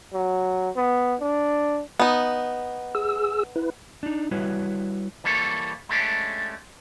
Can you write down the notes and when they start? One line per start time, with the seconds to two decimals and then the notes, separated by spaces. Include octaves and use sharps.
0.13 F#3
0.77 B3
1.21 D4
1.99 B3 D#4
2.95 G#4 E6
3.56 E4 B4
4.03 D4 D#4
4.31 G3 E4 F#4 B4 C#5
5.24 E3 G3 A#3 A4 B4 C#5
5.89 G#3 A3 C#4 D4 G4